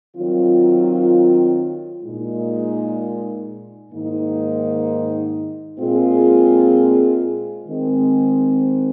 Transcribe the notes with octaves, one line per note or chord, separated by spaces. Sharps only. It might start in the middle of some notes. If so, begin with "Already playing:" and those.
D#3 F#3 C4 F4
A#2 G#3 D#4
G#2 D#3 A#3 D#4
A#2 G#3 C4 F4 G#4
D#3 G#3 C4